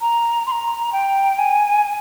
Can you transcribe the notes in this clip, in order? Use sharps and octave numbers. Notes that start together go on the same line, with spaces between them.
A#5
C6
A#5
G5
G#5
G#5